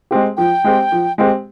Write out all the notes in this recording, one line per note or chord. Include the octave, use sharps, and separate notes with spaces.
G#3 C4 G4
F3 G5
G#3 C4 G4
F3
G#3 C4 G4